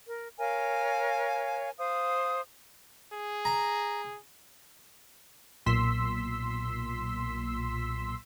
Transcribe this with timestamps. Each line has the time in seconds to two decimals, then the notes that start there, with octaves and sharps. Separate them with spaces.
0.06 A#4
0.38 A#4 C#5 F5 G#5
1.78 C5 F5 D#6
3.13 G#4
3.45 A#5
5.66 B1 A#2 C6 E6 B6